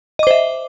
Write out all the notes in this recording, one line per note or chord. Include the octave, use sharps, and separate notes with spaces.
C5 D#5 E5 D6